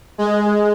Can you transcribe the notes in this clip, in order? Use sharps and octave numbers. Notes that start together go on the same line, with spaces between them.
G#3